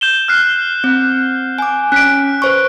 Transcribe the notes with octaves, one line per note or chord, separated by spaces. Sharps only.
G6 E7 G7
F6 F#6 C7
C4
G#5 D6
C#4 F#6 B6 D7
B4 C5 C#6